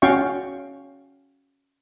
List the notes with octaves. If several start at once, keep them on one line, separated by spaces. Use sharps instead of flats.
C#4 F#4 F5 G5 C#6